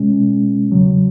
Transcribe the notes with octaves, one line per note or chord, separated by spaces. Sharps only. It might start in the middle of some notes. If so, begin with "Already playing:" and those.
Already playing: B2 G#3 C#4
E2 C#3 F#3